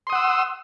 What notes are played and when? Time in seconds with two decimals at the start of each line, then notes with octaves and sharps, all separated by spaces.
0.07 C6
0.10 D#6
0.12 F#5
0.15 E6